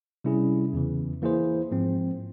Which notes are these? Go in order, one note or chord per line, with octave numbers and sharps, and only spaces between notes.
C3 G3 C#4 E4 G#4
E2 C#3 E3
E3 A#3 E4 G#4 C5
G#2 F3 C4